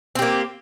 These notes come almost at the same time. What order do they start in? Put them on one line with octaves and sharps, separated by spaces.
C4 G4 A#3